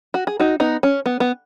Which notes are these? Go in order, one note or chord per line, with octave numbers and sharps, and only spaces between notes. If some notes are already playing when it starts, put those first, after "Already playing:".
F#4
G#4
D#4 F#4
B3 D#4
C#4
B3
B3